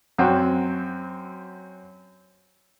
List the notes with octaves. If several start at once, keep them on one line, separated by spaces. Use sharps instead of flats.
F#2 F#3 C4 F#4